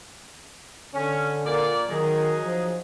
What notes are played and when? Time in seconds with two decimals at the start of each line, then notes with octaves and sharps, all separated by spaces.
0.93 D3 C#4
1.45 A#2 D5
1.88 D#3 F#3 D#4 G#4
2.42 F3